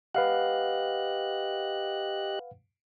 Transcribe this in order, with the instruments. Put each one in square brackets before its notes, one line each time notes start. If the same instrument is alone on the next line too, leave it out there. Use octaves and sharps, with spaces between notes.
[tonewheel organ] G4 D#5 F#6 [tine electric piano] B4 F5 F#5